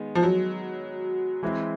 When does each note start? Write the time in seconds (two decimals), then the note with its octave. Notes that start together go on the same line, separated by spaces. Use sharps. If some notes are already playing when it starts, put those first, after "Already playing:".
Already playing: D#3 G#3 B3
0.15 F3
0.23 F#3
1.43 E3 G#3 C4 E4